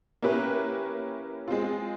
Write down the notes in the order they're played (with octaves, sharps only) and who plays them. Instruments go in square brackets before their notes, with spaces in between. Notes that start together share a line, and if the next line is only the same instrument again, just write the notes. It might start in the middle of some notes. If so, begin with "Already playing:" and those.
[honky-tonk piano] A#3 C#4 E4 G4 B4
G#3 C4 F4